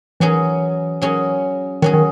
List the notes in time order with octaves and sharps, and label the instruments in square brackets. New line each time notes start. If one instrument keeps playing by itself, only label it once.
[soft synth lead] E3 [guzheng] F#3 C#4 G#4
[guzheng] F#3 C#4 G#4
[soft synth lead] D#3 [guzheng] F#3 C#4 G#4
[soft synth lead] D#3